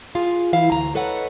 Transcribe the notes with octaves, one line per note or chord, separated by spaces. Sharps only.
F4 G#4 F5
E3 E4 F5
D2 A#5
A4 B4 C#5 D#5 F#5